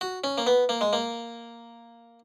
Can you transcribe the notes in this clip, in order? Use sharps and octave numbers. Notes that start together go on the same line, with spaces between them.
F#4
C#4
A#3
B3
A#3
G#3
A#3